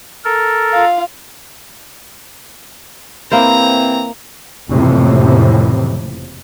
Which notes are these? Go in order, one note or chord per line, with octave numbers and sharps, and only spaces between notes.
A4 A#4
F4 F5
C3 E3 A#3 C4 E4 C5 A#5
F#1 F2 A2 C3 E3